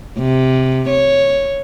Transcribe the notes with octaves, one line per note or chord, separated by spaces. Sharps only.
C3
C#5